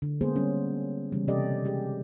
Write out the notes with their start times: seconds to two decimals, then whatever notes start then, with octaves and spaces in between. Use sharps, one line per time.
0.02 D3
0.21 G#3 A#3 B3 G#4 C5
0.36 D3 G3 B3 C#4
1.12 C#3 E3 G3
1.28 C3 C#4 G4 A4 D5 D#5
1.65 G#3 G4 G#4